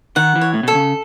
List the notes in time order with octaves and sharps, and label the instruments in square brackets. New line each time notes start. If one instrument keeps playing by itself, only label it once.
[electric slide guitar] D#3 [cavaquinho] F#5
[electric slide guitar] E3
[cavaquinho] C#5
[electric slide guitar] A2
[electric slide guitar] B2 [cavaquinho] A4
[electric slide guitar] C#3